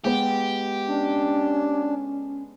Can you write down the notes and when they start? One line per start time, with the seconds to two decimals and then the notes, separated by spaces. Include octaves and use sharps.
0.05 G#3 B3 G4
0.88 C#4 D4